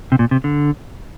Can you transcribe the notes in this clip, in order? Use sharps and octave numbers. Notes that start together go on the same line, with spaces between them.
C3
A#2
C3
D3